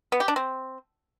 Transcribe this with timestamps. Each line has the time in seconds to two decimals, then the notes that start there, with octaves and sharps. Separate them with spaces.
0.12 B3
0.20 G4
0.28 D4
0.36 C4